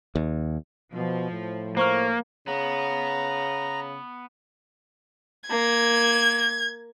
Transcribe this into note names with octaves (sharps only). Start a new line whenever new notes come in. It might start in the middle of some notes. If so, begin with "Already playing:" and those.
D#2
B2 F3
A2
A#3 C5 C#6 F6
C#3 B3 A#5
A#3 G#6